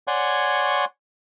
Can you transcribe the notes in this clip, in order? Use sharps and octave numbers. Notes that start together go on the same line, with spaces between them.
C#5 D5 F#5 G#5 C6 C#6